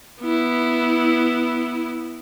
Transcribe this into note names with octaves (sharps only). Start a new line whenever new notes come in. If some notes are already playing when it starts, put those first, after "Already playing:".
B3 E4